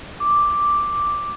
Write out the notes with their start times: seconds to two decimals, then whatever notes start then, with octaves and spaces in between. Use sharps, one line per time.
0.20 D6